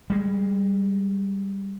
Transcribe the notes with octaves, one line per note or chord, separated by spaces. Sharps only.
G3 G#3